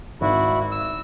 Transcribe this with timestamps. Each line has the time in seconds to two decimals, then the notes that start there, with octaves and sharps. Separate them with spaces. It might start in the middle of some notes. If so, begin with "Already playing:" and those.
0.21 G#1 E4 F#4
0.71 E6